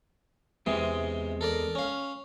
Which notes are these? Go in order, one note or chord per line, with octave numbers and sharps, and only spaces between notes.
E2 C3 E3 G#3 C4
A4 A#4 D5
C#4 F5